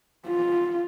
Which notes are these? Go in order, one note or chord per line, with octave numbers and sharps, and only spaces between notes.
F4